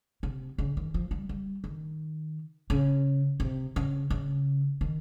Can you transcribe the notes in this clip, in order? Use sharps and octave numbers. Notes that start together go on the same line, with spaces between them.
C3
C#3
D#3
F3
G3
G3
D#3
C#3
C3
C#3
C#3
D#3